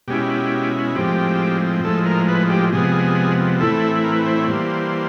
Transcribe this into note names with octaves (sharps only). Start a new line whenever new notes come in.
B2 G#3 C#4 E4 G4
A2 F3 G#3 C4 G4
A2 F3 G#3 A4
A#4
B4
G4
C3 F3 G#3 B3 G#4
A2 E3 A3 C4 E4 A4
A#4
B4
C5
C#5
E3 G3 A#3 C5